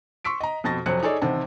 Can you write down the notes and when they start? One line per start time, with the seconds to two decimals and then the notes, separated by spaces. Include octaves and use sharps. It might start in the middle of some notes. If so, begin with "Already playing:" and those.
0.25 C6 C#6 E6 B6 D7
0.40 D#5 A#5
0.64 F2 B2 A5 A6 A#6
0.86 F2 C3 F#3 C5 F#6 C#7
1.03 D#4 G#4 A4 C#5 D5
1.22 A1 C3 D#3 C4 A5